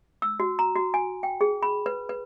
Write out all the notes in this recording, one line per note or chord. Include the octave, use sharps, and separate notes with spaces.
E6
F#4
A#5
F#4
G#5
G5
G#4
B5
B4
B4